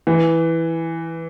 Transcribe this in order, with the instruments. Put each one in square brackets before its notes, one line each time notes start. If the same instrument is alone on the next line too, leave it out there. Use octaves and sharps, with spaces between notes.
[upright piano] E3